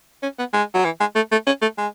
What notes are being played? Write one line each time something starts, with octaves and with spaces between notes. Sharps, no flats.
C#4
B3
G#3
F#3
E3
G#3
A3
A3
C#4
A3
G#3